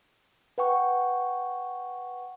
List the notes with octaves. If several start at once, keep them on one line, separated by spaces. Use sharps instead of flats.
B4 F#5 G5 C#6